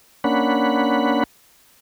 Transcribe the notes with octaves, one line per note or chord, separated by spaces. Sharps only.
A#3 C#4 D4 F#5 B5